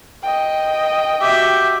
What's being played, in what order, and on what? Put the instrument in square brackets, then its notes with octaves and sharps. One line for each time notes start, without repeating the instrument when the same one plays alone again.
[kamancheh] D#5 G5
[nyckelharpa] F#4 E5 [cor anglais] G4